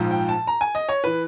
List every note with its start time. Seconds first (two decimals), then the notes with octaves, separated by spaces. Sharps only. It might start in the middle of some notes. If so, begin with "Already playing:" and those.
Already playing: A#1 G#2 F3
0.11 G5
0.29 A5
0.47 A#5
0.61 G#5
0.75 D#5
0.89 C#5
1.04 E3 B4